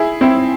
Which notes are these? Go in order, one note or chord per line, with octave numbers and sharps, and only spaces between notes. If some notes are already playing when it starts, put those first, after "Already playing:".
Already playing: E4 G#4
C4 E4